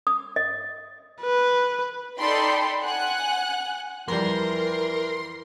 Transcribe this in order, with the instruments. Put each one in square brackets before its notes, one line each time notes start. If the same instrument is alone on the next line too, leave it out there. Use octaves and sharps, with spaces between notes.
[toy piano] D#6
D#5
[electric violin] B4
[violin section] D#4 A4 D5 G5 B5 C6
F#5 G#5 F#6
[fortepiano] F2 G3 [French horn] E3 [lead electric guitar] A#4 [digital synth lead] C6